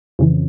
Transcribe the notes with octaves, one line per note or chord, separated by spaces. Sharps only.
F2 C#3 E3